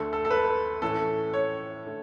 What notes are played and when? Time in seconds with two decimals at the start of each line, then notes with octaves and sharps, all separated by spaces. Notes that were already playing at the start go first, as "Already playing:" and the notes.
Already playing: D2 D3 A3 A4
0.13 A4
0.25 A4
0.30 B4
0.82 A2 E3 A3 C#4 A4
1.34 C#5
1.86 D3 A3